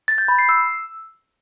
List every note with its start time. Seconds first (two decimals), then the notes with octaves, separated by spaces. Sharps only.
0.08 A6
0.18 G6
0.28 B5
0.39 C7
0.49 E6